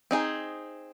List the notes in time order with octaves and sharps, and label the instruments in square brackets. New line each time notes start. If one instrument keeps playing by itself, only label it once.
[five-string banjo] C4 D#4 G#4